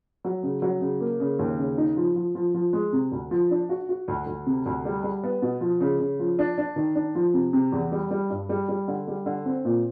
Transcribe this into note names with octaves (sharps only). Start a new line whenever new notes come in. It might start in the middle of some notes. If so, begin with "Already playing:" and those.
F#3
C#3
F#3
C#3
A#3
C#3
D#2
C#3
D#4
F3
F3
F3
F3
G#3
C3
D2
F3
D4
F#4
F#4
D2
D2
C3
D2
G3
G3
B3
B2
F3
C#3
C#3
F3
D4
D4
D#3
D4
F3
C3
C3
E2
G3
G3
G2
G3
G3
D3
G3
D3
C4
A#2